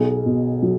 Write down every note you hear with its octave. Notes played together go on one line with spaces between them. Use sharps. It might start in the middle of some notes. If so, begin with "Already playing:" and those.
Already playing: B1 G#4
B2
F#3